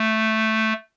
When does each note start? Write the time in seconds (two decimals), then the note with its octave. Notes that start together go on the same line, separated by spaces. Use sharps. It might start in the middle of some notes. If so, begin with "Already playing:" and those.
Already playing: A3